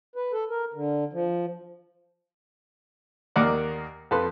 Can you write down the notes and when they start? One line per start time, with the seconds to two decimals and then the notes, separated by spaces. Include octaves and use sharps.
0.16 B4
0.33 A4
0.50 A#4
0.74 D3
1.13 F3
3.36 D#2 D#3 A#3 A#4 D5 F#5
4.11 F2 A4 B4 C6